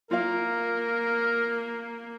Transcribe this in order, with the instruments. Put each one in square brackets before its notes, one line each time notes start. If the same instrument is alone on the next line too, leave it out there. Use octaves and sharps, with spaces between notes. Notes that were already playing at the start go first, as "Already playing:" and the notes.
[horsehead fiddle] A#3 [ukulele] F4 F5 [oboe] A#4